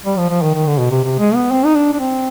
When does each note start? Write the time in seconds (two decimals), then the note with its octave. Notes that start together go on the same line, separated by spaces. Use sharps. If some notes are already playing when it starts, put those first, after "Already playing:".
0.06 G3
0.18 F3
0.30 F3
0.42 D#3
0.54 D#3
0.67 D3
0.79 B2
0.91 C3
1.04 C3
1.19 G#3
1.35 B3
1.51 C4
1.65 D#4
1.75 D4
1.93 D4
2.00 C4